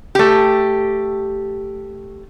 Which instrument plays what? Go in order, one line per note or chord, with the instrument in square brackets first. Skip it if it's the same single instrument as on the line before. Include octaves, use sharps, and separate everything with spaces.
[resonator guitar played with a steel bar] A3 G4